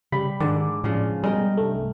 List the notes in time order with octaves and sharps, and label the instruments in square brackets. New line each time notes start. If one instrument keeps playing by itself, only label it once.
[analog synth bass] C#3 [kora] G3 [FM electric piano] B5
[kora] G#2 D3 [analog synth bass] D#3 [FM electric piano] D5
[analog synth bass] A2 [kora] C#3 F3 G#4
[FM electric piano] B2 G#3 [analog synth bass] G3 [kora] D#4 A#4 G5
[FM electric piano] C2 G2 A3